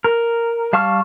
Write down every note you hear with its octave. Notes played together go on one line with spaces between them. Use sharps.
A#4
G3 F5 A5 C#6 F6